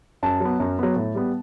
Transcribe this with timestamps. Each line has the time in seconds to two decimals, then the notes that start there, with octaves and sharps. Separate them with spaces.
0.23 F#2 A5
0.40 F#3 B3
0.60 F#2
0.79 F#3 B3
0.96 A2
1.15 G3 B3